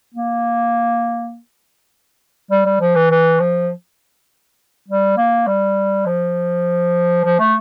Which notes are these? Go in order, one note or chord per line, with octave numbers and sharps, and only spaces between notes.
A#3
G3
G3
F3
E3
E3
F3
G3
A#3
G3
F3
F3
A3